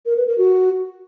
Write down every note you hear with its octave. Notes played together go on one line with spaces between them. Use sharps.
A#4
B4
A#4
F#4